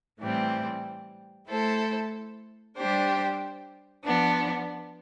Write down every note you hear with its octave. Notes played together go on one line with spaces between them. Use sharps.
A2 E3 G3 C4
A3 E4 A4 C5
G3 D4 G4 C5
F3 B3 D4